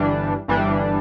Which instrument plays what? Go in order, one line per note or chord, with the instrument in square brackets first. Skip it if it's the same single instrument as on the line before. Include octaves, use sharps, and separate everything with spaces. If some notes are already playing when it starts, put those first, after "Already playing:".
Already playing: [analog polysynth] G1 G2 E3 G3 D4
G1 G2 E3 G3 D4